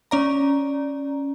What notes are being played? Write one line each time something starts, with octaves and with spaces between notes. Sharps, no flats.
C#4 D5 A#5